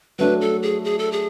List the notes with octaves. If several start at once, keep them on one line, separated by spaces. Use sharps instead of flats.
F#3 A3 D4 B4
A4
G#4
G#4
A4
G#4